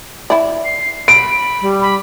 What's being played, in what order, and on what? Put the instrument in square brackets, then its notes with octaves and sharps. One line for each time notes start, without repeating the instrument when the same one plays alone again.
[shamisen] E4 D5
[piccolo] C7
[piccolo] B5 [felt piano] D7
[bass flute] G3
[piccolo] B5